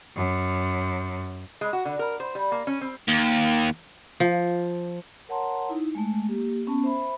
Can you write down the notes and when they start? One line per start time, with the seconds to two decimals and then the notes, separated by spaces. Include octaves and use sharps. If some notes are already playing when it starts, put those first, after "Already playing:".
0.16 F#2
1.61 G#3
1.73 F#4
1.85 D3
1.99 A#4
2.20 C5
2.35 G3
2.52 A#3
2.67 C#4
2.81 C4
3.08 D#2
4.20 F3
5.29 A#4 C#5 F#5 A5 A#5 C6
5.69 D#4 E4
5.95 G#3 A3
6.27 A#3 G4
6.67 B3 C#4 A5
6.84 C5 E5 B5